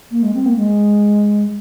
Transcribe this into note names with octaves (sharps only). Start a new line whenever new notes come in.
A#3
G#3
C4
A#3
G#3